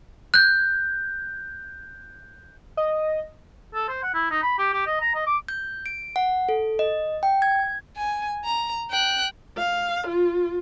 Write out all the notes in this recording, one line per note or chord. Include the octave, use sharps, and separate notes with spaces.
F#6 G6
D#5
A4
C5
F#5
E4
D#4
B5
G4
G4
D#5
A#5
D#5
D6
G6
D7
F#5
A4
D#5
G5
G#6
G#5
A#5
G5 F#6
F5
F4